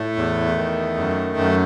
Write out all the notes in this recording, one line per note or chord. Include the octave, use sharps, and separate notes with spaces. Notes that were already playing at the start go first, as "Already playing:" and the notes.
Already playing: A2 A3
E2
D#3
F#2
F#2